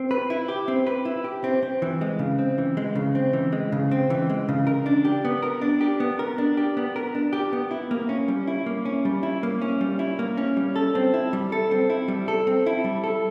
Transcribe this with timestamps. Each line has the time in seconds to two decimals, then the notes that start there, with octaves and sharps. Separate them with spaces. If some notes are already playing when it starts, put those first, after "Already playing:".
Already playing: C4
0.11 B4
0.30 E4
0.48 G4
0.68 C4
0.87 B4
1.05 E4
1.24 G4
1.44 C4
1.63 C4
1.82 E3
2.01 G#3
2.19 C#3
2.39 C4
2.58 E3
2.77 G#3
2.95 C#3
3.15 C4
3.33 E3
3.52 G#3
3.72 C#3
3.91 C4
4.10 E3
4.30 G#3
4.49 C#3
4.67 A#4
4.86 D4
5.05 G4
5.25 B3
5.42 A#4
5.61 D4
5.81 G4
6.00 B3
6.19 A#4
6.38 D4
6.57 G4
6.77 B3
6.96 A#4
7.15 D4
7.33 G4
7.53 B3
7.71 E4
7.91 A#3
8.09 C#4
8.28 G3
8.48 E4
8.66 A#3
8.85 C#4
9.05 G3
9.23 E4
9.43 A#3
9.62 C#4
9.81 G3
9.99 E4
10.19 A#3
10.37 C#4
10.57 G3
10.76 A4
10.95 C4
11.14 E4
11.33 G3
11.52 A4
11.71 C4
11.90 E4
12.08 G3
12.28 A4
12.47 C4
12.66 E4
12.84 G3
13.04 A4